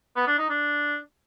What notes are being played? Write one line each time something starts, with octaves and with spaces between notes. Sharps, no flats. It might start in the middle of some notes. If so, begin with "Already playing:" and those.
B3
D4
D#4
D4